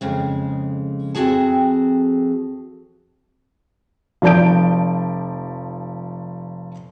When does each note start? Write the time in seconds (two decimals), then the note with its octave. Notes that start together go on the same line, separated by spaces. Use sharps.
0.01 F2 C#3 G#3
1.15 F2 C4 F#4 G#4 A5
4.22 F1 F3 D5 A5 G6 D7